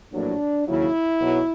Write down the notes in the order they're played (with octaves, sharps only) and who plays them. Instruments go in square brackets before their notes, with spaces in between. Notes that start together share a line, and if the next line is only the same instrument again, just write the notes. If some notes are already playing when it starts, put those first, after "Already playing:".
[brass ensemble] A#1 A2 F#3 D4
D#2 C#3 F#3 E4
B1 B2 F#3